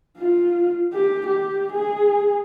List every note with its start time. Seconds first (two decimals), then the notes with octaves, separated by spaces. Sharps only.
0.18 F4
0.93 G4
1.27 G4
1.73 G#4